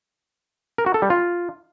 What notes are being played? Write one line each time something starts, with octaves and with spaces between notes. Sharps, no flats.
A#4
F#4
A4
G3
F4